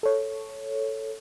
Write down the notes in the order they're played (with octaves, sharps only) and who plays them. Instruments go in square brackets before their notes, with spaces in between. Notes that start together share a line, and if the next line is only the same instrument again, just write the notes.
[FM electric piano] A4 C#5